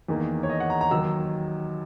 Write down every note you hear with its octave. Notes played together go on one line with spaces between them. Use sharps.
E2 D#3 A#3
C#5
D#5
F#5
A#5
A#5
D#2 D#3 F#3 E6